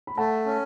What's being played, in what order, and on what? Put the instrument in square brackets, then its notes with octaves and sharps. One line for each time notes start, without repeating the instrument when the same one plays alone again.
[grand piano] B5
[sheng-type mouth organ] A3 [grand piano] F#5 A5
[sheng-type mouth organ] C#4